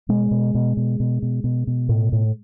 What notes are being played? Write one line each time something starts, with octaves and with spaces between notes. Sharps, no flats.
B2 G#3
B2
B2
B2
B2
B2
B2
B2
A2
A2